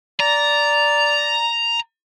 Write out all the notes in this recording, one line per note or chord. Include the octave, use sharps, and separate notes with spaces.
D5 A#5